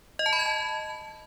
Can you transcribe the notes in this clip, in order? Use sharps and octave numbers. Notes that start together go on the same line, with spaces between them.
D#5
A5
B5
G#6
A5